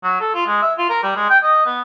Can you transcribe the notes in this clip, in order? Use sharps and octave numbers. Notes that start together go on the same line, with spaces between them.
F#3
A4
F4
G#3
E5
F4
A#4
G3
G#3
G5
D#5
B3